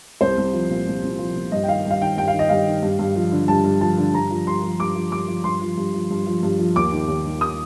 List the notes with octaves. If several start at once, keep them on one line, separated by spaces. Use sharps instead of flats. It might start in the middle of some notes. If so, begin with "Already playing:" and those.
C2 C5
C2
F3
A#2
C2
C2
F3
A#2
G2 D#5
G5
D#3 F5
G2
F5
D#3 G5
G2 G5
F5
D#3
D#5
G2 F5
D#3
G2
G2
F3
D3
G2 A5
G2
F3 A5
D3
G2 A#5
F3
G2 C6
F3
G2 D6
F3
G2 D6
F3
G2 C6
F3
G2
F3
G2
F3
G2
F3
D#2 D6
D#3
D#2
D#3
D#6